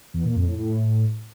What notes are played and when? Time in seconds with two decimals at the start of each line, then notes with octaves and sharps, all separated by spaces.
0.14 E2
0.25 A#2
0.36 F2
0.47 A2
0.58 A2